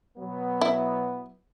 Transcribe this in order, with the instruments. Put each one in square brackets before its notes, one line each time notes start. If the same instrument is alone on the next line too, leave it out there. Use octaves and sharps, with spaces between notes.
[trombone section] B2 F#3 B3
[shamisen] E4